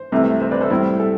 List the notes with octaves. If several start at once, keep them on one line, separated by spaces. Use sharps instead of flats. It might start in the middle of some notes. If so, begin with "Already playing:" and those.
Already playing: C5
C2 C3 E3 A3
C5 E5
B4 D5
A4 C5
A2 G3 C4 E4
A4